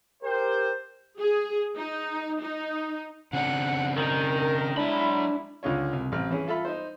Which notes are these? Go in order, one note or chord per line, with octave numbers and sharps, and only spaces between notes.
G4 A#4 C5
G#4
D#4
D#4
C#3 C4 D4 F#5
D#3 D#4 A#4
F#3 G#3 D4 E4 B5
C#2 D3 F4 C#5
C2
A1 C4 F6
E3 C#4 E4 G#4
F4 A4 E5 B5
D#4 C5